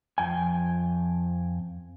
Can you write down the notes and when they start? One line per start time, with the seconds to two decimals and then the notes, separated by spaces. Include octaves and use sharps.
0.18 F2 G5 G#5